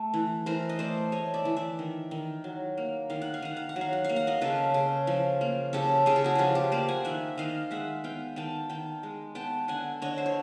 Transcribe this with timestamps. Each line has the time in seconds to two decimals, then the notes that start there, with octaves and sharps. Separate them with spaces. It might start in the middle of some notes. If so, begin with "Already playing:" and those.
Already playing: A3
0.14 E3
0.46 E3 A#4 C5
0.69 D#5
0.79 A3 C5 D5
1.12 A3 C#5 D#5
1.34 D5 E5
1.45 E3
1.56 D5 E5
1.79 D#3
2.11 D#3
2.44 F#3
2.78 A#3
3.10 D#3 F5
3.22 F#5
3.34 F5
3.42 D#3 F#5
3.57 F5
3.69 F#5
3.76 F#3
3.81 F5
3.93 F#5
4.04 A#3 F5
4.16 F#5
4.27 D#5 F5
4.41 C#3 A4 B4
4.74 C#3
5.07 F3
5.41 A#3
5.73 C#3 G4 A4
6.06 C#3 G#4
6.16 A4
6.24 F#4 G#4
6.35 F3 F4 G4 G#4
6.55 G4 A4
6.72 A#3 C5 D5
6.88 F#5 G#5
7.05 D#3 E5 F#5
7.38 D#3 D#5 F5
7.71 G#3 E5 F#5
8.04 B3 F5 G5
8.36 D#3 G5 A5
8.70 D#3 G5 A5
9.03 G#3
9.35 B3 G5 A5
9.68 D3 F#5 G#5
10.02 D3 C#5 D#5
10.18 C5
10.26 C#5